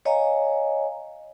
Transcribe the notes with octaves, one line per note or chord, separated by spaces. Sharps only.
C#5 D#5 F5 G#5 A#5